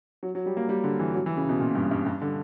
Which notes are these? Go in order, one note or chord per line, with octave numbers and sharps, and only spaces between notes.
F#3
F#3
G3
A#3
G3
D3
E3
F#3
E3
C#3
B2
A#2
G2
G2
G2
D3